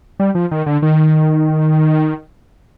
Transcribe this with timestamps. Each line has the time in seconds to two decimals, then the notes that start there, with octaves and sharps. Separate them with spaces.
0.20 G3
0.35 F3
0.51 D#3
0.66 D3
0.82 D#3